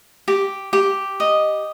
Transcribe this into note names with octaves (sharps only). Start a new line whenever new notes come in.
G4
G4
D#5